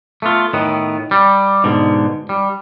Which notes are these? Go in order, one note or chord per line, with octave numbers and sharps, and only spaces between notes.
A3 B3 F4
A2 D#3 B3
G3
G#2 B2 D3
G3